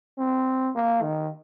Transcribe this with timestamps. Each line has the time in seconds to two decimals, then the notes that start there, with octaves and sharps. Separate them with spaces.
0.18 C4
0.75 A#3
1.02 D#3